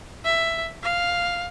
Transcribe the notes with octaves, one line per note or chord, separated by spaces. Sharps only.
E5
F5